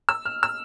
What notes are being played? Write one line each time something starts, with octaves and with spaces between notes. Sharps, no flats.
E6
F6
E6